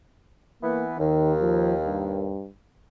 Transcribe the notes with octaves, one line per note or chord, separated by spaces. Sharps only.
E3 A#3 B3
D#2 D#3
F3
G2